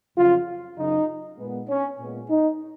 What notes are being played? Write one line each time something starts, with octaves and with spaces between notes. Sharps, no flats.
F2 C#3 F#3 F4
F#2 C#3 F#3 D#4
A#2 G#3 B3
C#4
A#2 G#3 B3
D#4